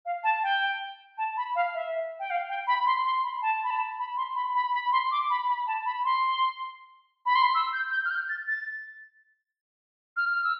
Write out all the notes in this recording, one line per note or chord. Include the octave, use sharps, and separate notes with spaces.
F5
A5
G5
A5
B5
F5
E5
G5
F5
G5
B5
C6
C6
B5
A5
B5
A5
B5
C6
B5
B5
B5
C6
D6
B5
B5
A5
B5
C6
B5
C6
E6
G6
G6
F6
G6
A6
A6
F6
F6
E6